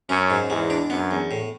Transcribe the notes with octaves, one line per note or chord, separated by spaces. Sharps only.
F#2 C#4
G#2
E2 G#3
D4
F#2 B3
E2
A2